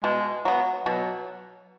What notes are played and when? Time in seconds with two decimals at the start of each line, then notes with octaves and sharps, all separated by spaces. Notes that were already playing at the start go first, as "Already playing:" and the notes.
0.04 B2 G#3
0.45 F#3 B3
0.86 B2 F#3